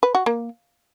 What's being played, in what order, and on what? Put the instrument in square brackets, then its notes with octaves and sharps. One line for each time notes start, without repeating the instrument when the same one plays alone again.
[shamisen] B4
F#4
A#3